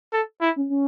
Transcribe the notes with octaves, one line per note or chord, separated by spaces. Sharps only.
A4
E4
C#4
C#4